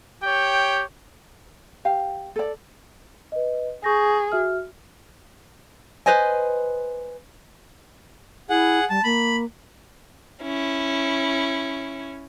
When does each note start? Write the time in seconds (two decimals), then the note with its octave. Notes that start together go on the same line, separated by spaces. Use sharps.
0.23 G4 C#5 G5
1.85 G4 F5
2.36 A4 D5
3.32 B4 D#5
3.84 G#4 C#6 G6 A#6
4.32 F#4 E5 F6
6.06 B4 C5 D#5 G#5
8.50 E4 G#4 F#5
8.90 G3 A5
9.04 A#3 B5
10.43 C#4 E4